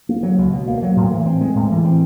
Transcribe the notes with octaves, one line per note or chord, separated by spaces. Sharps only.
A#3
F#3
C#2
B2
A#3
F#3
A2
E3
C4
G#3
A2
E3
C4